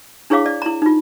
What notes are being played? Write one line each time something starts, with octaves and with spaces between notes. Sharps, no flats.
D4 E4 G#4 C#5 F5 D6
D5
E4 A#5
D#4 F4